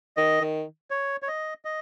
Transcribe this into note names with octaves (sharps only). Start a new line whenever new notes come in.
D#3 D#5
D#3
C#5
C#5
D#5
D#5